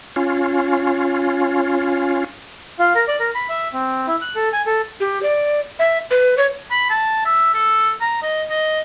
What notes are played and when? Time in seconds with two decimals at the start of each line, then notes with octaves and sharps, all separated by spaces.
0.16 C#4 F4
2.79 F4
2.95 A#4
3.08 D5
3.20 A#4
3.35 B5
3.49 E5
3.73 C4
4.07 E4
4.21 F#6
4.36 A4
4.53 G#5
4.66 A4
5.00 G4
5.23 D5
5.79 E5
6.11 B4
6.38 C#5
6.71 B5
6.90 A5
7.25 E5
7.54 A4
8.01 A#5
8.22 D#5
8.50 D#5